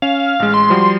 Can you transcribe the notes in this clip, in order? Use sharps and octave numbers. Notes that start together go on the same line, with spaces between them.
C#4 F5
A1 G#3
C6
F3 G3 F#4